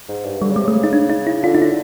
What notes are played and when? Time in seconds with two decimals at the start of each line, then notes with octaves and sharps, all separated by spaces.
0.08 G#2
0.26 G2
0.42 D3 G3
0.50 C#3
0.56 C3 G#3
0.67 C#3 A3
0.84 D#4
0.93 D4
1.10 D#4
1.27 E4
1.43 D3 F4
1.54 D#4
1.62 E4